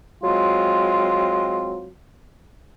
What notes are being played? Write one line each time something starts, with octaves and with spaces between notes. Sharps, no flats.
F#3 G#3 C4 F4